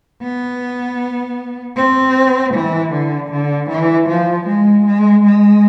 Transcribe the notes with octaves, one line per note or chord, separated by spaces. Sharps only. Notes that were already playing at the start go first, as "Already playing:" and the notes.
B3
C4
E3
D3
D3
E3
F3
G#3
G#3
G#3